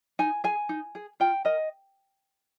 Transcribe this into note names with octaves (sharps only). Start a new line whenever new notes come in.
D#4 G#5
G#4 G#5
D#4
G#4
F4 G5
A#4 D#5